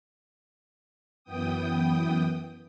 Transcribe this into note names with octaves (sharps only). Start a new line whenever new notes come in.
F#2 E3 B3 G5 D#6